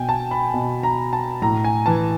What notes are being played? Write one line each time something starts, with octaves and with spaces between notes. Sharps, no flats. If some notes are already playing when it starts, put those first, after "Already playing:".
Already playing: B2 G5 G#5
A5
B5
B2
A#5
A5
A2 A#5
G#5
E3 A5